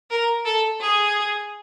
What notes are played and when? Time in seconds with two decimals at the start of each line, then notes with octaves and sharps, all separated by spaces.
0.10 A#4
0.45 A4
0.81 G#4